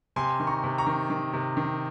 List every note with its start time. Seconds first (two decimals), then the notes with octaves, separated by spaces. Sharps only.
0.16 C3 G#5 C6
0.40 D#3
0.47 A#5 C#6
0.63 C3
0.78 A#5 C#6
0.87 D#3
1.10 D#3
1.33 C3
1.57 D#3